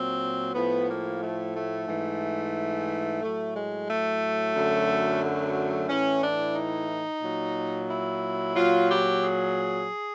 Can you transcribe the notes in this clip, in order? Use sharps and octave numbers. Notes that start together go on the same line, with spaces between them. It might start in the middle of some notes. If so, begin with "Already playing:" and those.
Already playing: A#2 F#3 C4
A2 F3 B3
A#3
A3
A3
G#2 E3
A2 F#3 A3
G#3
A3
F#2 D3 F#3
A3
A2 E3 C#4
D4
D#4
A#2 F#3
E4
A#2 F#3 F4
G4
G#4